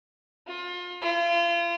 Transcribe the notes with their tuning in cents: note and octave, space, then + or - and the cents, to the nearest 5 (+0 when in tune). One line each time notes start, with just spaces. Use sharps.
F4 +30
F4 -35